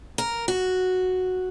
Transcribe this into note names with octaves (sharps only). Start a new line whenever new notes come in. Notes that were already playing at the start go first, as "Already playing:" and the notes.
A#4
F#4